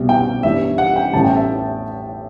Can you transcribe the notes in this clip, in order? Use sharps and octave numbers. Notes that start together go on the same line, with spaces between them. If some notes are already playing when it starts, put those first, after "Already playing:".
Already playing: C2 B2 G3
G5
G1 G2 E3 G3 E5
F#5
G5
A1 A2 E3 G3 A5
G5
E5